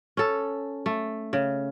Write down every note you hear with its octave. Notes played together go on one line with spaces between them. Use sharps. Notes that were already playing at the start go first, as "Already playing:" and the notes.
C#4 A4
A3
C#3